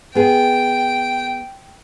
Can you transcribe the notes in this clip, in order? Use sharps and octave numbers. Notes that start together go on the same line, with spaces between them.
B3 G#4 G5